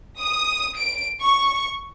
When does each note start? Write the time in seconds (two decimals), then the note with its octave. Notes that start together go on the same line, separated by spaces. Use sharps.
0.20 D#6
0.76 D7
1.21 C#6